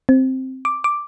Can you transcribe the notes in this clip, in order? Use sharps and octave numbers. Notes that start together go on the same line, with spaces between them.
C4
D6
D6